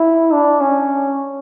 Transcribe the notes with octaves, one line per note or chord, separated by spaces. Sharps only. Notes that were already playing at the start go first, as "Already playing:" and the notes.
Already playing: E4
D4
C#4